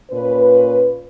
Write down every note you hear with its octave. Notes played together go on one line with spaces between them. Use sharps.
A#2 C#4 B4